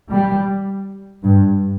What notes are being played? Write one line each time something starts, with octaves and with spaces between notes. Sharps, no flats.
G3
G2